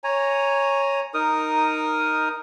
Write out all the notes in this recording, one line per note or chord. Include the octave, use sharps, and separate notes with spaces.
C#5 G#5 A#5
D#4 A#4 D#6